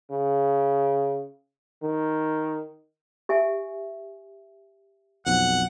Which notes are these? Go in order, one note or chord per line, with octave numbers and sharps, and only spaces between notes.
C#3
D#3
G4 E5 G#5
B1 F2 F#5